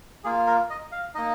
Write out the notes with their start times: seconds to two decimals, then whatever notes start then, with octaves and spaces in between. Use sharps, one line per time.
0.24 A#3 F4 G#4
0.47 A#4
0.70 D#5
0.92 F5
1.14 A#3 D#4 D#5